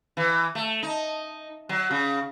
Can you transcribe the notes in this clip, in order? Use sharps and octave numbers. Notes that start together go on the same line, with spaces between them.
E3
A3
D#4
F#3
C#3